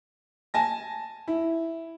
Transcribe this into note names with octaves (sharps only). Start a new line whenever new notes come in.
G#5 A5 A#6
E4